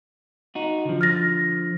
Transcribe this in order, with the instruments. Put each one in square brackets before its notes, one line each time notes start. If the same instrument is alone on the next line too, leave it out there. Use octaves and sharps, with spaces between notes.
[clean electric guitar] D#4 F#4
D3 F3
[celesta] F6 A6 A#6